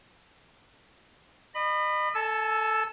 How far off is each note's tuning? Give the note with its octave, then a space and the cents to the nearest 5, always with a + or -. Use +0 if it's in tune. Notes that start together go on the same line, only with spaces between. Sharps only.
D#5 -35 B5 +5
A4 +5 G#5 +45 E6 +0